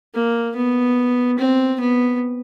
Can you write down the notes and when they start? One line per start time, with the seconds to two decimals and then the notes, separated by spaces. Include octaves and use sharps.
0.14 A#3
0.56 B3
1.39 C4
1.80 B3